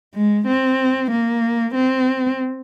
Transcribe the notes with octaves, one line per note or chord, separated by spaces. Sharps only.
G#3
C4
A#3
C4